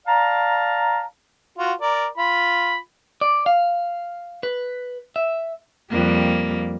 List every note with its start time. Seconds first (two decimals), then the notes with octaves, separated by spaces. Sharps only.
0.06 D5 F5 A5 A#5
1.58 F4 F#4
1.81 A#4 D5
2.18 F4 B5
3.21 D5
3.46 F5
4.43 B4
5.16 E5
5.90 F2 G3 A#3